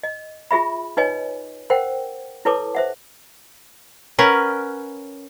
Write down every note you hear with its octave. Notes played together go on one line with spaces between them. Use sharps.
D#5
F4 G#4 E5 B5
D#4 B4 C#5 D#5 G#5
A#4 C5 F#5 G5
E4 A4 B4 C#5 A5 D6
C5 E5 F#5
C#4 A#4 B4 F#5